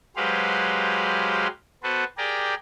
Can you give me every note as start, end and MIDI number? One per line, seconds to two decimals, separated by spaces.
0.16 1.47 54
0.16 1.47 56
0.16 1.47 67
0.16 1.47 71
0.16 1.47 72
0.16 1.47 77
1.83 2.04 59
1.83 2.04 66
1.83 2.04 69
1.83 2.04 71
1.83 2.04 72
2.18 2.55 67
2.18 2.55 68
2.18 2.55 70
2.18 2.55 74
2.18 2.55 79